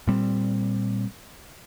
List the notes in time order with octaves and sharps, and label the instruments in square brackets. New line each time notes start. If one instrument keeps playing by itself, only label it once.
[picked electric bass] A#2 G3 C4